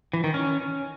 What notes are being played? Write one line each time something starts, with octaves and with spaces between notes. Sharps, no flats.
E3
D#3
C#4